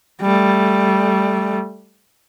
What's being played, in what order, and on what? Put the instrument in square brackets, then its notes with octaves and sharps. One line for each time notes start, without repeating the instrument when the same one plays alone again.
[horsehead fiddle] G3 A3